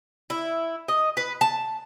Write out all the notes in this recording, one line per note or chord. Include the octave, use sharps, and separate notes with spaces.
E4
D#5
B4
A5